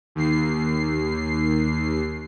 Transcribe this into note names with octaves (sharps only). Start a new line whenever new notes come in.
D#2 C7